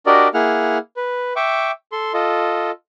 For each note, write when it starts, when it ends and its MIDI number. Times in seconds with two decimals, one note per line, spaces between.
0.06 0.28 62
0.06 0.28 66
0.06 0.28 67
0.06 0.28 70
0.06 0.28 74
0.06 0.28 75
0.34 0.78 58
0.34 0.78 64
0.34 0.78 68
0.34 0.78 78
0.34 0.78 89
0.97 1.33 71
1.36 1.71 76
1.36 1.71 79
1.36 1.71 85
1.36 1.71 86
1.92 2.13 69
1.92 2.13 84
2.14 2.71 65
2.14 2.71 69
2.14 2.71 75